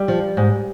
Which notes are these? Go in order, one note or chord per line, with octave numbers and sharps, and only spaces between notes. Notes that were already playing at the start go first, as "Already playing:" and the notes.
Already playing: G3
F3
G#2